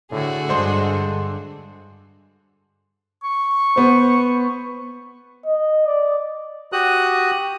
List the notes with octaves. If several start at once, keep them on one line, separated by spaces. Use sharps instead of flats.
A2 D3 F#4 G#4
G2 D3 G#3 D4 C5 C6
C#6
B3 C5
D#5
D5
F#4 G4 D#6 F#6